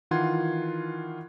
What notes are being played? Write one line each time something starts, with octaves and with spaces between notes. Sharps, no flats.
D#3 E3 F4 F#5 C6 G#6